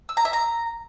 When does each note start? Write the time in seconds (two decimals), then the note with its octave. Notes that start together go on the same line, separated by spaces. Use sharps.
0.09 E6
0.17 A#5
0.25 E5
0.33 A#5